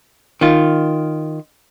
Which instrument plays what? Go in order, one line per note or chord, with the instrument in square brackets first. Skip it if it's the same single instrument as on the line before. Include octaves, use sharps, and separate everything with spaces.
[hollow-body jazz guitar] D#3 F4